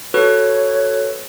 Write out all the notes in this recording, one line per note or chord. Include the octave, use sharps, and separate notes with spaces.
F#4 A4 B4 C#5